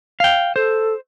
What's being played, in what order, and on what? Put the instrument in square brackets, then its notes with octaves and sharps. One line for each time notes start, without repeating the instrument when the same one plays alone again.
[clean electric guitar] F5 G5
[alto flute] A4 [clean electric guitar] C5